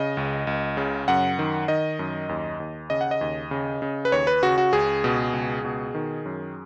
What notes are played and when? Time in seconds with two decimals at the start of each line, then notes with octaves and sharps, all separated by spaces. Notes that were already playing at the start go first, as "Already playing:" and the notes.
Already playing: C#3 D#5
0.17 C#2
0.47 C#2
0.77 C#3
1.08 F#2 F#5
1.39 D#3
1.68 D#3 D#5
1.99 F#2
2.29 D#2
2.60 D#2
2.90 C#3 D#5
3.01 F#5
3.11 D#5
3.21 D#2
3.51 C#3
3.82 C#3
4.05 B4
4.12 D#2 C#5
4.27 B4
4.42 C#3 F#4
4.58 F#4
4.73 C#2 G#4
5.04 B2
5.33 C#2
5.65 B2
5.95 D#3
6.26 F#2